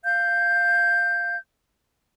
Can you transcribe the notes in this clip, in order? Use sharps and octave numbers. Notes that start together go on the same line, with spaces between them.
F5 G6